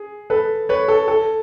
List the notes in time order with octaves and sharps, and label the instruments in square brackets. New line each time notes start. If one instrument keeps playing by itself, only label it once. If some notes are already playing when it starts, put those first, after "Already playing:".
Already playing: [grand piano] G#4
A4 B4
B4 C#5
A4
A4